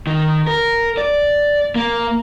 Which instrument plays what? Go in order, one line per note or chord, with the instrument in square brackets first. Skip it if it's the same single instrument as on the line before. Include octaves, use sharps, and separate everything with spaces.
[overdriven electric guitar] D#3
A#4
D5
A#3